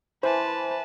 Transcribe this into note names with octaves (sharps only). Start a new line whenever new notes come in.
E3 B4 C5 A5